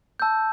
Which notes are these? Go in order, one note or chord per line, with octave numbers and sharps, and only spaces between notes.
A5 E6 G6